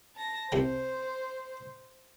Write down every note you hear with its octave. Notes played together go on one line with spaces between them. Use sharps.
A5 A#6
C2 C3 C5 G5